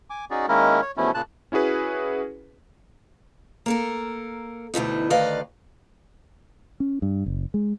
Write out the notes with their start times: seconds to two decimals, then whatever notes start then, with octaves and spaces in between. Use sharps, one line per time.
0.10 G#5 D6
0.31 C#4 D#4 F#4 G#4 D5
0.48 D#3 G#3 A#3 C#4 E4 A#4
0.82 C#5
0.97 E2 B2 F3 A3 C#4 E4
1.14 A#2 C#3 A5 F#6
1.52 C#4 E4 F#4 G#4 B4
3.66 A#3 A4 A#4
4.74 D2 B2 E3 D#4
5.10 D2 D#3 B4 D5 D#5 F5
6.80 C#4
7.02 G2
7.26 F#1
7.54 G#3